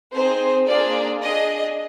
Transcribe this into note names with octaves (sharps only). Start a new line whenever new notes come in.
C4 D#4 G#4 C5
A#3 D4 F4 G#4 D5
D4 G#4 D#5